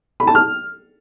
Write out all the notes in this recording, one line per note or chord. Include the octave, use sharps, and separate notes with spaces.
B5
A5
F6